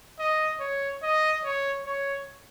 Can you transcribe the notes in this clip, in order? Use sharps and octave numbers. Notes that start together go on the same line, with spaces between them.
D#5
C#5
D#5
C#5
C#5